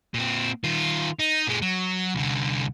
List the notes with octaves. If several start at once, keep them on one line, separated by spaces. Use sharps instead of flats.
A#2 C4
D#3 F4
D#4
A#2 G#3
F#3
C2 D3